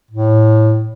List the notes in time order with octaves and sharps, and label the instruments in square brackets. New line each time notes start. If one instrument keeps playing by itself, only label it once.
[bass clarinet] A2